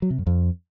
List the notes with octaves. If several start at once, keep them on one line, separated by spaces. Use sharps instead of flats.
F#3
C3
F#2
F2